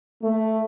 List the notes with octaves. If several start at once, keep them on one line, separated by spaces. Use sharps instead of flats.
A3